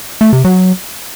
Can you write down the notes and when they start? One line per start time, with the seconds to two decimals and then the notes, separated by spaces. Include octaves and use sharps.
0.21 A3
0.33 C3
0.45 F#3